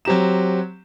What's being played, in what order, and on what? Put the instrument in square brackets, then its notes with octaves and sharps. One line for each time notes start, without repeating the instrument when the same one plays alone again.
[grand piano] F#3 C4 G4 A#5 E7